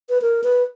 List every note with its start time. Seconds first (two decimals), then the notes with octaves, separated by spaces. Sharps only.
0.10 B4
0.22 A#4
0.44 B4